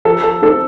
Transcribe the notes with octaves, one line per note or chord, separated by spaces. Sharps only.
F3 A4
A4
C4 D#4 A4